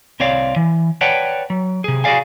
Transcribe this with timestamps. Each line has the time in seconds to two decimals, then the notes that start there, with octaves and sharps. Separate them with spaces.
0.20 C2 C4 C#5 D5 F5
0.56 E3
1.01 B4 C#5 D5 F#5 G5 A5
1.50 F#3
1.84 C3 G#4
2.04 F#4 G#4 A#4 D5 F5 G#5